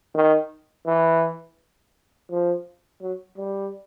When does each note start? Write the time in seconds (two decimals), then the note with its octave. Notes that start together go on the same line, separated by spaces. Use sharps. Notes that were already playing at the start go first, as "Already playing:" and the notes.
0.15 D#3
0.87 E3
2.31 F3
3.02 F#3
3.38 G3